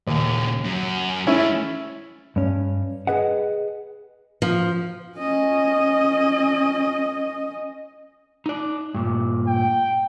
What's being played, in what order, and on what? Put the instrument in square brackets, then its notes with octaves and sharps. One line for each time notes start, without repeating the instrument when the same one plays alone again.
[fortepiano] D#2 [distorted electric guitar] A#2 C#3
[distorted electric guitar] F#2
[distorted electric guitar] G#3 A3 [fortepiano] C#4 E4
[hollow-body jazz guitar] G2 C#4
G#4 B4 D#5 F#5
[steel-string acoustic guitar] F3
[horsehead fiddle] C#4 D#5
[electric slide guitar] D#4 D5
G2 A#2
[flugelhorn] G5